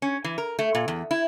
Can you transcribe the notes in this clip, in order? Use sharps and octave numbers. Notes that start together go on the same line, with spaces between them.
C#4
E3
A#4
A3
A#2
E2
E4